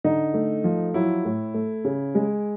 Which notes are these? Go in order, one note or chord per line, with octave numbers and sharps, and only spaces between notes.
D3 D#4
A3
F3
F#3 E4
A2
A3
C#3
G#3